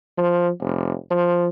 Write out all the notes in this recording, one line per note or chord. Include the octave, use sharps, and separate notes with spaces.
F3
F1
F3